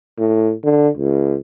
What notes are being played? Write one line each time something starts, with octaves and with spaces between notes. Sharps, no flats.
A2
D3
C#2